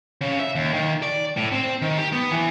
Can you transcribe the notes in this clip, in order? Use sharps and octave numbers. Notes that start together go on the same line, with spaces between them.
C#3
E5
D#2
D#3
D5
A2
C4
D#3
G4
B3
E3